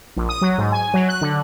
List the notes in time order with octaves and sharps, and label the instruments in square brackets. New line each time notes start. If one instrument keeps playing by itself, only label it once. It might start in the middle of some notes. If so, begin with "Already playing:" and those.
[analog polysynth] A#1
D#6
F#3
G#2
G#5
F#3
F#6
D3